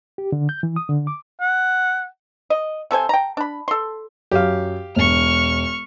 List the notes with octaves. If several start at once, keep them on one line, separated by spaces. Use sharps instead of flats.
G4
D3
G6
E3
D#6
D3
D6
F#5
D#5
C3 A4 C5 G#5
G5 A#5
D4 B5
A4 C6
F#2 G4 F5
E1 C#6 F6